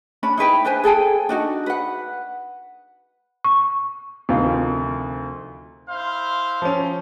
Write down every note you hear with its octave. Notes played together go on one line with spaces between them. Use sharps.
C#4 D4 B5
D#4 E4 B4 G5
D4 B4 C5 G#5
G#4 A4 G5 G#5
D4 D#4 F#4
B4 F#5
C#6
D2 C3 D#3 F3 F5
E4 C5 F5
F3 C#4